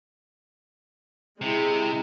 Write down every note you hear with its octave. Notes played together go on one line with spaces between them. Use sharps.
C3 G#3 E4